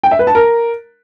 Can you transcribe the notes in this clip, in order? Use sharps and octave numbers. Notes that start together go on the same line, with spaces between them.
G5
E5
B4
A5
A#4